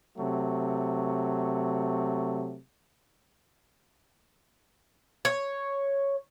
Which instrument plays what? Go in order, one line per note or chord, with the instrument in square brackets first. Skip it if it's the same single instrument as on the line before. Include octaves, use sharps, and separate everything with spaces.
[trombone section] C3 F#3 A3
[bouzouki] C#5